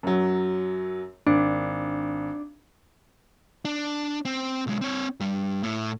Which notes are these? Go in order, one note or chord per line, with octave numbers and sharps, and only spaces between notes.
F#2 F#3
G#1 D4
D4
C4
B1 G#3
C4 C#5
G2 G3
A2